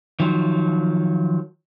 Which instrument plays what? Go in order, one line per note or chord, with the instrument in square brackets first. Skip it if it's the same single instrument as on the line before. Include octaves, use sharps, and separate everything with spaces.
[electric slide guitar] D#3 F3 F#3